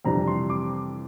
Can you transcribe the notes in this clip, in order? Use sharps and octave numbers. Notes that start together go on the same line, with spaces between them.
F2 C3 E3 G3 D4 A#5
C6
D6